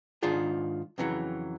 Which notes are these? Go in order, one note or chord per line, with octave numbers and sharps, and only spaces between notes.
G#2 D#3 D4 F4 G#4
F2 C#3 E3 F#3